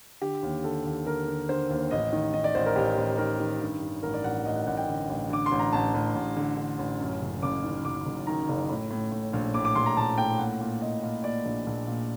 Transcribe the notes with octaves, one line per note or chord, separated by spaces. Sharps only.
D3 G4
D#2
D3 A4
D#2
D3 A#4
D3
D3 C5
D#2
A1 D#5
D#3
D#3 D#5
D5
A1 C5
A#4
A1 G4
A1
D#3 A#4
D#3
G2
G2
A1 A#4
D5
A1 F#5
A1 D#5
F#5
A1 F#5
G5
D3
A1
D3 D6
C6
A1
A#5
A1 A5
A1
A1
D3
D3
A1
F#2
F#1
F#1 D6
D#3
F#1 D6
F#1
D#3 A#5
F#1
A2
A2
A2
A#1
A2 D6
D6
A#1 C6
A#5
A#1 A5
A2 G5
A#2 F#5
A#2
A#2 D#5
A#2
A#2 D5
A#1
A#1
A#2